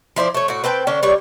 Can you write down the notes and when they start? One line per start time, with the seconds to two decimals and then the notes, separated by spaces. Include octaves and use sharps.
0.16 F3 E4 C5 D5
0.34 A3 C#5
0.48 A2 F#4
0.64 C4 B4 G5 A5
0.87 D3 C#4 D4
1.03 G3 B4 C#5 D5